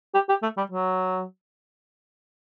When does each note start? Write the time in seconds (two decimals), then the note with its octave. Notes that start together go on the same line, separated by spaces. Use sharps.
0.15 G4
0.29 G4
0.43 A3
0.57 G3
0.72 F#3